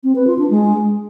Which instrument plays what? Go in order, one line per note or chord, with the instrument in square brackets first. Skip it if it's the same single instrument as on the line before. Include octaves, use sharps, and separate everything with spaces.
[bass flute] C4
B4
F4
D4
G#3